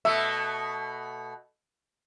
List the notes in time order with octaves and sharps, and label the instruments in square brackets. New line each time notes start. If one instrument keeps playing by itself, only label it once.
[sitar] B2 A3 [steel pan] E5